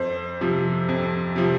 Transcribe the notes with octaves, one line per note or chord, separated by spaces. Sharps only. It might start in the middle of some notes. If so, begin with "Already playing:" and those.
Already playing: F2 C5
C3 F3
F2
C3 F3